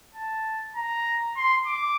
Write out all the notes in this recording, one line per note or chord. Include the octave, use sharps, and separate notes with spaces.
A5
A#5
C6
D6